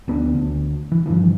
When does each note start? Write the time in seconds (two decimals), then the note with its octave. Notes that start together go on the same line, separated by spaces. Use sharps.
0.08 D2 B3 D4
0.34 D2
0.92 E3
1.06 G2 D3 E3 F3